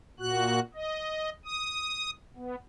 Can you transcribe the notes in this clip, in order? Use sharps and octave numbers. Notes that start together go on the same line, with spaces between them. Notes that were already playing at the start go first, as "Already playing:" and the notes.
A#2 F#4 F#6
D#5
D#6
B3